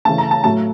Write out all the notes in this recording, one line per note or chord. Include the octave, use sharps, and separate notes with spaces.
C#3 E3 A3 A5
A#5
A5
A2 F#3 A3 A5